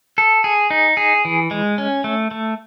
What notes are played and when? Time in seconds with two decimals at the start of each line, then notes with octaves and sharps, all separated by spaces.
0.18 A4
0.44 G#4
0.70 D#4
0.97 G#4
1.25 E3
1.51 G#3
1.78 C#4
2.04 A3
2.31 A3